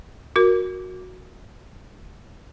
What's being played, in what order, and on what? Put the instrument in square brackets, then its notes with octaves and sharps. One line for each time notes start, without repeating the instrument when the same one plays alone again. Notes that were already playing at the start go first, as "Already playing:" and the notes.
[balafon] F#4 A#4